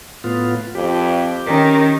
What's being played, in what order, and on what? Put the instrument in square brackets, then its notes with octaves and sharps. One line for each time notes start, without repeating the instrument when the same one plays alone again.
[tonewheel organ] A2 B3 F4
[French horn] F2 [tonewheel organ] G4
[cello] D#3 [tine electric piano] C#4 G5 B6 [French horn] A#4